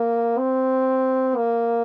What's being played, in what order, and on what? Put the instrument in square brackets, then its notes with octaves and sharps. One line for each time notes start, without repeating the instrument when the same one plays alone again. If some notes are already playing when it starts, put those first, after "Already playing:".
Already playing: [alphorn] A#3
C4
A#3